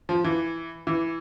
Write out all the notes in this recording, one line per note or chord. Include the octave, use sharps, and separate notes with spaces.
F3
E3
E3